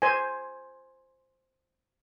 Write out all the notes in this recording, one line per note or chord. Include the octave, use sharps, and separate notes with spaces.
C5 G#5